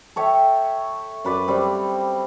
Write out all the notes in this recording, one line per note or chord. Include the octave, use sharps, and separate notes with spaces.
A4 C#5 E5 G5
F#2 B4 D5
G3 C4